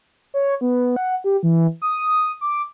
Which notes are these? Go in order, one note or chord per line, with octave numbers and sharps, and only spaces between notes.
C#5
B3
F#5
G4
E3
D#6
D6